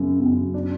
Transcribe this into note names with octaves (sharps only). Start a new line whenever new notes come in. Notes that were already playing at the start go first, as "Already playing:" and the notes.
Already playing: F#2 C#3 F#3
F#2
D4